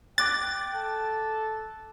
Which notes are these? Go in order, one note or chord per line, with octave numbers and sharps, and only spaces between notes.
G5 D6 F#6 A6
A4